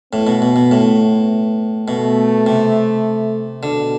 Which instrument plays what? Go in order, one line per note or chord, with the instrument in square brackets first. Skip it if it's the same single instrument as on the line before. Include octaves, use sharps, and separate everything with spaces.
[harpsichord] A2 [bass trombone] B3
[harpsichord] B2
B2
B2
A2
[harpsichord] B2 [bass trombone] A3
[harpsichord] C3
[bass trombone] B2 [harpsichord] D3